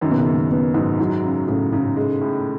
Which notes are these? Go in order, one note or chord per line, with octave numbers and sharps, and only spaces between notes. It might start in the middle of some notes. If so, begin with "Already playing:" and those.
F#2 D#3
B2
C#3
F#2
B2
B2 B3
G#2 F#3
G#2 F#3
C#3
A2 C#3
G#2 C#3
G#3
A2